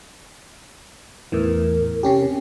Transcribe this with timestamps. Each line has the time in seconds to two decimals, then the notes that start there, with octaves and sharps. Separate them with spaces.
1.32 E2 A2 E3 A#4
2.03 C3 C#4 G4